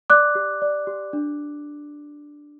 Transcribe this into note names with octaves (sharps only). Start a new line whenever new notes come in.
D5 D6 F#6
G4
D5
G4
D4